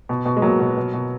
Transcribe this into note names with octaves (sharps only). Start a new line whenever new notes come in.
B2
B2
G#3
B2 F#3 A#3
B2
B2
B2